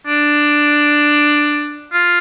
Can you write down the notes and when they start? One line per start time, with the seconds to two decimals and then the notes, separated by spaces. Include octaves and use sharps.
0.07 D4
1.92 F4